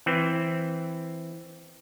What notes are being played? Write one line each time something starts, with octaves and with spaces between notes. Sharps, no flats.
E3 C4